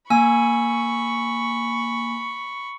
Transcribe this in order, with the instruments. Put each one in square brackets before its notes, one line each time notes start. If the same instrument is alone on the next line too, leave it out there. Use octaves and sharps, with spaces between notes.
[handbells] A#3 G#5 E6 [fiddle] B5 C#6